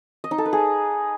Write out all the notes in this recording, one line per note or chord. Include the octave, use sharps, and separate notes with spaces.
D#5
D#4
A4
B4
G#4